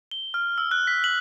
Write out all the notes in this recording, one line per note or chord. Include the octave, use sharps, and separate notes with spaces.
G7
F6
E6
F#6
B6
F#7